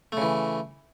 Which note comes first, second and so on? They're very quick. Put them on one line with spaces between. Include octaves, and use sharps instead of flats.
A3 C#3 E3